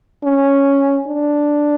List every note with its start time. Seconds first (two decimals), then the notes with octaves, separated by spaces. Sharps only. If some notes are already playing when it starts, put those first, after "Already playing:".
0.24 C#4
1.07 D4